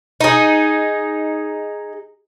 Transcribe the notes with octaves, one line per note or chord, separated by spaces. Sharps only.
D#4 G#4